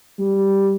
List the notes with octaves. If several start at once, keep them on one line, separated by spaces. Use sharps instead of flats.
G3